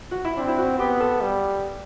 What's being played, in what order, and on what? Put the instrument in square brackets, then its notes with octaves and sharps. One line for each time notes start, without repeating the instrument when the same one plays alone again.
[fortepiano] F#4
E4
[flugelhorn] C4 [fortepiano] D4
[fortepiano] E4
F#4
[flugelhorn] B3 [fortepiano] G4
[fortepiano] A4
[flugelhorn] G3